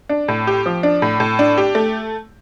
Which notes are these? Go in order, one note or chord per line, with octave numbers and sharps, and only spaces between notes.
D4
A2
G4
F3
D4
A2
A2
D4
G4
A3